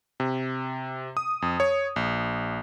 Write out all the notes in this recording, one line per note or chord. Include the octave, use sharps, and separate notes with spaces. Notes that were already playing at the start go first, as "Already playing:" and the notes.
C3
D#6
F2
C#5
A#1